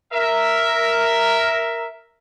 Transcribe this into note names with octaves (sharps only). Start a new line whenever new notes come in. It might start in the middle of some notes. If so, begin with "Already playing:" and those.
A#4 E5